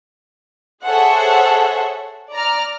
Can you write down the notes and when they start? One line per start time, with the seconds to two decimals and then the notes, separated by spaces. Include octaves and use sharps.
0.85 G#4 A4 C5 C#5 E5 F#5
2.31 D5 A#5 F6